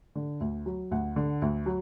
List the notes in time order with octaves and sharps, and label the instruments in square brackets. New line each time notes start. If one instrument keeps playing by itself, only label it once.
[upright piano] D3
D2
F#3
D2 F#5
D3
D2
F#3